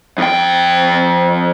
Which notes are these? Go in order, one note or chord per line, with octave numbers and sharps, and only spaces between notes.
F2 G5